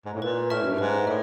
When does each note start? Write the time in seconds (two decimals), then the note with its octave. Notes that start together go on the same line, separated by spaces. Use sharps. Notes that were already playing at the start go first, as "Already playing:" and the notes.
0.05 G#2
0.14 A2
0.22 A#2 B4
0.50 A2 E5 A5 C#6 F6
0.63 F#2
0.71 G2
0.78 G#2 B4
1.07 A2 E5